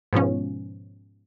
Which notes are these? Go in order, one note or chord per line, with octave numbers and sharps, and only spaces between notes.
G#2 B2 F3 C#4